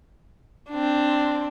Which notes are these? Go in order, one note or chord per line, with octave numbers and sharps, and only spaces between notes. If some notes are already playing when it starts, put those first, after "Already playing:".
C4 D4